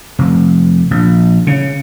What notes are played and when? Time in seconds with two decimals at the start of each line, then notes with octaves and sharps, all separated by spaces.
0.19 F1
0.91 A#1
1.47 C#3